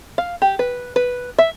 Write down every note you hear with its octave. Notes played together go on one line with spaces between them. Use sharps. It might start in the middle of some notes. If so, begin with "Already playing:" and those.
F5
G4
B4
B4
E5